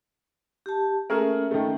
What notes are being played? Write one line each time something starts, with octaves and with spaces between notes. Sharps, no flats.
G4 A5
A3 A#3 C#4 G#4 A#4 E5
D#3 A3